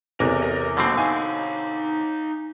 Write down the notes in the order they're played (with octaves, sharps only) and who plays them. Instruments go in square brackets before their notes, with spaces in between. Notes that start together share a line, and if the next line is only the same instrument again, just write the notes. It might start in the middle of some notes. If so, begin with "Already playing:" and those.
[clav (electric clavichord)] A1 [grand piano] E2 C3 [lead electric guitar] A#4
[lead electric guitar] A#4
[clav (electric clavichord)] B2 D3 C4 [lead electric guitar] F#3 A#3
[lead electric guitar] D#4 F5 [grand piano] G#5